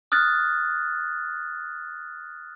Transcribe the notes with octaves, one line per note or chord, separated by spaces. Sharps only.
D#6 F6 F#6 A6